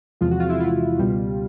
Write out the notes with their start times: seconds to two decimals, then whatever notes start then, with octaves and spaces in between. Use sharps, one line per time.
0.21 E2 C3 F3 G#3 F4
0.31 F#4
0.40 F4
0.50 E4
0.60 F4
0.98 C#2 B2 G3